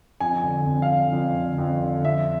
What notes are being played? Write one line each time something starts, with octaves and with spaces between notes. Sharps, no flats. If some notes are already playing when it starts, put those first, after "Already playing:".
F2 G#5
D3
F2
F5
D3
F2
D3
F2
D3
F2 E5